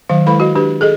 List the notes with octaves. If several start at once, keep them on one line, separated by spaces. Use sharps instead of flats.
D#3 F#3 F5
G#3 E4 A4 B4 F5 B5
F#4 D#5
D4 G4 B4
G#4 A4 D#5